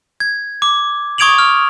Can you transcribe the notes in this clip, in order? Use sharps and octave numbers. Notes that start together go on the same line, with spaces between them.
G#6
D6
C#6 D#6 G#6 D7 F7 F#7
F6